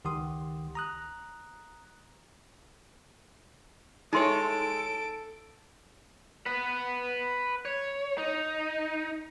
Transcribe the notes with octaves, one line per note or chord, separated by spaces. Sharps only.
C#2 D#3 G4 F#5 C6 D#6
A#5 D#6 F#6
G#3 D#4 E4 A4 C#5 C6 D7
B4 F#5
C#5
D#4